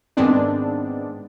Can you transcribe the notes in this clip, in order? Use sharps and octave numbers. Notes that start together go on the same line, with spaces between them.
G#2 D#3 G#3 B3 C4 D4